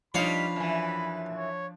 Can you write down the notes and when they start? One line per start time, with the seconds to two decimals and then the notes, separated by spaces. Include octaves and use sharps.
0.14 F3 G3 D4 D#4 C#5 F5 B5
0.56 F#2 E3
1.36 C#5